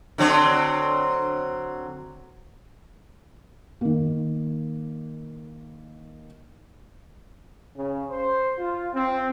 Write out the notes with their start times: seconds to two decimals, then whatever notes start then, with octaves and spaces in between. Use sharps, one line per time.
0.18 D3 F#3 C4
3.81 D#3 A#3
7.76 C#3
8.11 C5
8.58 F4
8.94 C4